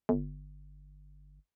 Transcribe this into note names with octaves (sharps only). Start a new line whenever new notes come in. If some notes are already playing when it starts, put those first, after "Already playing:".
G1